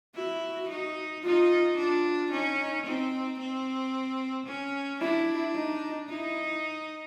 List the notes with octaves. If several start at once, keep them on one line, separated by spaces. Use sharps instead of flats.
E4 F#4
D#4
D#4 F4
D4 F4
C#4 D#4
C4 D#4
C4
C#4
D4 E4
D#4
D#4 E4